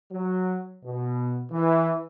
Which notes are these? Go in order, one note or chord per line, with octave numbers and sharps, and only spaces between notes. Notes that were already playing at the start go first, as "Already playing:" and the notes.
F#3
B2
E3